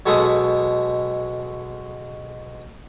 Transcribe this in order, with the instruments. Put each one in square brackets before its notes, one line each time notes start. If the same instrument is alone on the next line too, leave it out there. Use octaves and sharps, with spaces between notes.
[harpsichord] B1 B2 G#3 A4 C#6 D#6